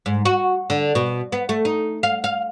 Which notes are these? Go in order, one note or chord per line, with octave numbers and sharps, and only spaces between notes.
G#2
F#4
D3
B2
B3
A3
D#4
F5
F5